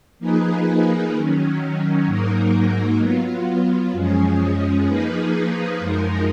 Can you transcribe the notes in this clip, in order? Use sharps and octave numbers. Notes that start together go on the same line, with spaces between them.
F3 A#3 D#4 G#4 B4
D#3 F#3 C#4
G#2 F#3 A#3 D#4 A#4
F#3 B3 F4
F#2 F3 G#3 C#4 G#4
F3 A#3 D#4 G#4 B4
F#2 F3 G#3 D#4 A#4